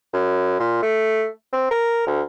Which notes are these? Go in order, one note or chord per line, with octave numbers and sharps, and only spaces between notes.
F#2
A#2
A3
C4
A#4
D2